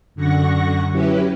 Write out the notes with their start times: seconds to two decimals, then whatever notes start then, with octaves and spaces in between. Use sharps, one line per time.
0.15 F#2 D3 F#5 C#6 A#6
0.91 F#3 C#4 E4 G4 B4